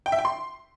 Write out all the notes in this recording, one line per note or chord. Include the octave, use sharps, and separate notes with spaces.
G5
E5
G5
C6